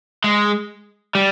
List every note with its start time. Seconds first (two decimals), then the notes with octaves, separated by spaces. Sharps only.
0.24 G#3
1.15 G3